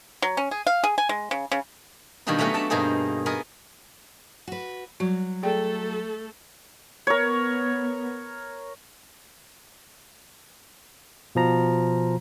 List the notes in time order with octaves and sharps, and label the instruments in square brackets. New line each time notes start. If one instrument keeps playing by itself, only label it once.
[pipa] F#3
C#4
G#4
F5
G#4
G#5
G#3
C#3
C#3
[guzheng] B2 D#3 G3 A#3 D4 D#4
F#3 A3 B3 C#4 F#5
D4 A4 A5
G2 B2 A#3 D#4 G#4 C5
B3 G#4 A#4 D#5
[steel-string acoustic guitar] F#4 B4
[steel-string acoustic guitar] F#3 [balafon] G3 F#4
[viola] A3 A4 [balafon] G#4 D5 G5
[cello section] B3 [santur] A#4 C#5
[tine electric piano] B2 F3 A#5